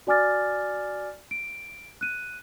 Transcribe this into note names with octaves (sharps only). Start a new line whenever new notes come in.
F#4 D5 G#5 D6 F6 A6
D7
F#6 D#7